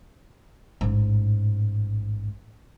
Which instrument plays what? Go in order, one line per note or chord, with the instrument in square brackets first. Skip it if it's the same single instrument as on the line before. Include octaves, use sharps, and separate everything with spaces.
[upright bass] A1 G#2